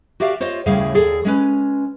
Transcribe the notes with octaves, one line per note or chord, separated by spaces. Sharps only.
F#4 G4 D5 E5 F5
F4 C5 C#5 D#5
D#2 A2 C#3 G3 G#4 F5
D#2 G#4 A4 D5
G#3 C#4 B4